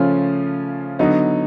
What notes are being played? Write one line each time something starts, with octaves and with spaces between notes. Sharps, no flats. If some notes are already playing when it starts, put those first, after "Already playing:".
Already playing: C#3 F3 A3 C#4 F4
D3 F#3 B3 D#4